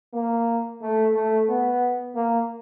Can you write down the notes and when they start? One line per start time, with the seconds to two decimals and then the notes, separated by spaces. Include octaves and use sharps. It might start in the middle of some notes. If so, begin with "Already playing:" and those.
0.13 A#3
0.81 A3
1.15 A3
1.49 B3
2.15 A#3